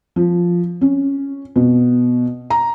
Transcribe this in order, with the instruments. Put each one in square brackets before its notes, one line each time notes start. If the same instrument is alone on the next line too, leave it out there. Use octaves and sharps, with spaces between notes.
[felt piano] F3
C#4
B2
A#5